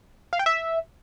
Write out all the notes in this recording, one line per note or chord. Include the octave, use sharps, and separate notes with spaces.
F5
G5
E5